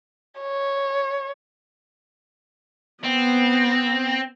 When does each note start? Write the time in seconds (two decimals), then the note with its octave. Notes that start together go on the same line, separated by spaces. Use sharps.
0.40 C#5
3.04 B3 C4